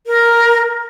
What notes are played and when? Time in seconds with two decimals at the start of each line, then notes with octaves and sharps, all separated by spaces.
0.07 A#4